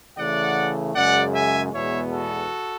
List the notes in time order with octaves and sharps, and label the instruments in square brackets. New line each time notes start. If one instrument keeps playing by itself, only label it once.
[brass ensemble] C#3 E3 A3 D5 F#5
F#2 C#3 G#3 D5 F#5
E5 G#5
E2 B2 G#3 B3 C#5 E5
F#4 A4